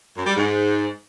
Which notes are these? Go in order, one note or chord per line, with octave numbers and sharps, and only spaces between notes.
F#2
G3
G#2